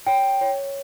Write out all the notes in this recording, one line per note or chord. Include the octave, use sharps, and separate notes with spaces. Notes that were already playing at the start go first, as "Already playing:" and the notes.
C#5 G5
C#5